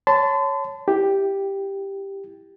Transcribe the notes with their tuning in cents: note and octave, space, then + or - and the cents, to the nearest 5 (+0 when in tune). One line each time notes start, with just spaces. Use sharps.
C#5 +0 A5 +0 C6 -45
E4 +0 G4 +0